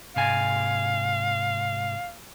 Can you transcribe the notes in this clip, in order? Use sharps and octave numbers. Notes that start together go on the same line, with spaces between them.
G#2 C3 F5 G#5